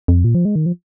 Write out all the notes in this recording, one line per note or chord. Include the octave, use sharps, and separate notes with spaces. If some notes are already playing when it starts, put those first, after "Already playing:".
F2
A#2
F3
G#3
D#3
F3